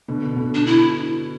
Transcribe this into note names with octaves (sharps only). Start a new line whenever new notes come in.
B2 D3
B2 D3
D4
E4